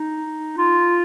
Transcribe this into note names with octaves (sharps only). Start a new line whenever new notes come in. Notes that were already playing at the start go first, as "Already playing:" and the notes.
Already playing: D#4
F4